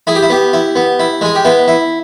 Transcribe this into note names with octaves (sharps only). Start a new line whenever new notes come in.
E4 G#4
G4
E4
B3 G4
E4
B3
E4
G#3 G#4
G4
B3 E4
E4